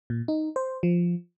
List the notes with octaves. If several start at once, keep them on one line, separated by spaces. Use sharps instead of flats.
A#2
D#4
C5
F3